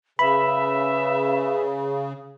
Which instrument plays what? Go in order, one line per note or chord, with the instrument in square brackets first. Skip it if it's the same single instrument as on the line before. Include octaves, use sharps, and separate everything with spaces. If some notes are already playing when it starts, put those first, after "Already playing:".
[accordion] C#3 [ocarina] B4 [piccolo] E5 [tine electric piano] B5